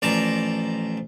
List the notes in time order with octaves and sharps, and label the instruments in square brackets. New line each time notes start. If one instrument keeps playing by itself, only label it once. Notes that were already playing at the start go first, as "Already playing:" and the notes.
[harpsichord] A1 F3 D5 A5 A#5